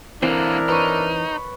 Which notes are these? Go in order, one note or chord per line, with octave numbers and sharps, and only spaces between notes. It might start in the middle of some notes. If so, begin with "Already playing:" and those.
D3 E3 A#3 C4 D4 E4 A#4
D#4 B4 C#5